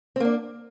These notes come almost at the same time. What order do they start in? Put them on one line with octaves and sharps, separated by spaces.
C4 A#3 D4